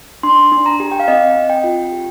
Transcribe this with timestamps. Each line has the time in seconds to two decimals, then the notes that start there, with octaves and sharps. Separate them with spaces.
0.23 D4 C6
0.52 D4
0.66 A#5
0.80 G4
0.92 G5
1.00 F5
1.08 C4 D#5
1.36 C4
1.50 G5
1.64 F4
1.92 G4